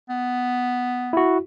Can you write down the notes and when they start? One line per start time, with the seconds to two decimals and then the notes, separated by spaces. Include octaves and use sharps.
0.10 B3
1.13 E4 F#4